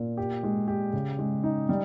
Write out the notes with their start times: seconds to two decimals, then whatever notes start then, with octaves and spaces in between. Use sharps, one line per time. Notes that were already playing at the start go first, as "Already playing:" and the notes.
Already playing: A#2
0.17 G4
0.43 G#3
0.68 G4
0.93 C#3
1.19 G#3
1.43 D#4
1.69 G3